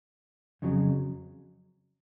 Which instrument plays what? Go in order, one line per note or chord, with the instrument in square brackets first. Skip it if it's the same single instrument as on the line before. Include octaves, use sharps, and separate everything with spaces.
[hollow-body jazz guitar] F2 C#3 F#3